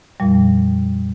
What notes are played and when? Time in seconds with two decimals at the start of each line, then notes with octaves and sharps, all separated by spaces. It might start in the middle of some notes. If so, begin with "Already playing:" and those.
0.20 F2 A#2 F3 G3